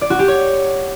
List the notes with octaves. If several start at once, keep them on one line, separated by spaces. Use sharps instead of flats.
D5
F#4
G4
C#5